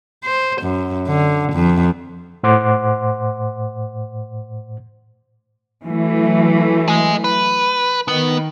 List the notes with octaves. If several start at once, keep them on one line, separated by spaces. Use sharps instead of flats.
C5
F#2
D3
F2
A2 C5 F#5 C6 D6
E3 F#3 A3
G#4 D#5
B4
D#3 B3